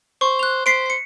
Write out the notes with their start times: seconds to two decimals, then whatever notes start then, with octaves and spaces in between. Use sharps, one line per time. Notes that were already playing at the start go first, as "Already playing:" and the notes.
0.21 C5 C#6
0.39 F#6 F7
0.66 C5 B6 C7 D7
0.86 B6 C#7